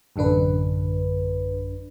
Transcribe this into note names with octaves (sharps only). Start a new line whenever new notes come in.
A1 F#2 D3 D4 B4